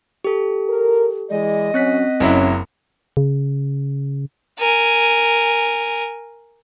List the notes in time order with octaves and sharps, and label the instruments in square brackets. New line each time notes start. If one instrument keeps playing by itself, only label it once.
[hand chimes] G4 A4
[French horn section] A#4
[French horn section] E3 G#3 D5 [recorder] D#5
[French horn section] F#3 C#4 [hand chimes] C4 F#6 B6
[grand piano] F#1 F#3 E4 [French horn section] C#4
[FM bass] C#3
[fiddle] A#4 G#5